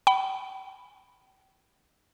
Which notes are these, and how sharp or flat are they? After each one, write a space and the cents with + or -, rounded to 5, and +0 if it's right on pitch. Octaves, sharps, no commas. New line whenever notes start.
G5 -40 B5 +0